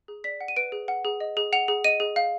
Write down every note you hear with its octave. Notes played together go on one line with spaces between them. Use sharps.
G#4
D5 B6
F#5
D#7
B4 D7
G#4
F#5
G#4
D#5
G#4
F#5 F7
G#4
D#5 D#7
G#4
F5